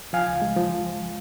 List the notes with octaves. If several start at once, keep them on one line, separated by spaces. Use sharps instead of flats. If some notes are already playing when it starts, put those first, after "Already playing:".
F3 F5 G#5
C#2
G#3
F3